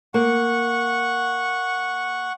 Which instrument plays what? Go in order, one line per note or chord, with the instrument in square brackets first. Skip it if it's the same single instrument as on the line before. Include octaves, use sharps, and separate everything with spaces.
[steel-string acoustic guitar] A#3 [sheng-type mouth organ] F#5 C#6